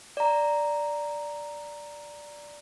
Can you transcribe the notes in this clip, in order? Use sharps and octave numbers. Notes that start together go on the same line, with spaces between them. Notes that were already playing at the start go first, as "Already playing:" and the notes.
D5 A#5